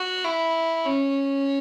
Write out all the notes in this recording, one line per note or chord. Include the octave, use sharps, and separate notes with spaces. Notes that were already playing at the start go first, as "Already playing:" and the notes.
Already playing: F#4
E4
C#4